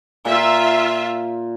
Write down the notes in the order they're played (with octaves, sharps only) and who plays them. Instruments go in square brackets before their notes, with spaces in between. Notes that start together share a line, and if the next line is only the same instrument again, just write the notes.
[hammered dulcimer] A#2 [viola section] F4 E5